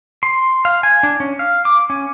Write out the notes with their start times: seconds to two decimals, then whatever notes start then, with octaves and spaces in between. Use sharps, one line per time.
0.23 C6
0.65 F5
0.83 G#5
1.03 D4
1.20 C#4
1.39 F5
1.65 D6
1.90 C#4